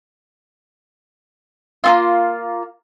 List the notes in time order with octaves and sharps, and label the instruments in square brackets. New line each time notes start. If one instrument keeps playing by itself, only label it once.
[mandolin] A#3 C4 F4